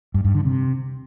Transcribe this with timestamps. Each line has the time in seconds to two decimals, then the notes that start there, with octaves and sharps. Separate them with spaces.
0.14 G2
0.24 G2
0.35 D3
0.45 C3